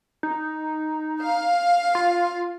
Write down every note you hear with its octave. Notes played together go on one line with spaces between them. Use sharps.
D#4
F5
F4